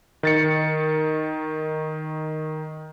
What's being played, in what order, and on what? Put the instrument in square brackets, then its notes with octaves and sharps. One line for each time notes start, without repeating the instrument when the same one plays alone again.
[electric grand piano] D#3 A6 C#7